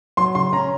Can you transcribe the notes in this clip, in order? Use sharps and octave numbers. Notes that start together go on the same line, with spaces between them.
F#3 C6
C#3 C6
C#4 A#5